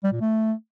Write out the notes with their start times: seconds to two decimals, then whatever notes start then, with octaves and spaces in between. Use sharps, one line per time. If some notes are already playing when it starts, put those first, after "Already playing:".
0.04 G3
0.12 A#2
0.21 A3